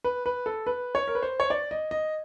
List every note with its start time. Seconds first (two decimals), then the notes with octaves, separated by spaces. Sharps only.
0.04 B4
0.26 B4
0.46 A4
0.67 B4
0.95 C#5
1.07 A#4
1.15 B4
1.23 C5
1.40 C#5
1.50 D5
1.71 D#5
1.91 D#5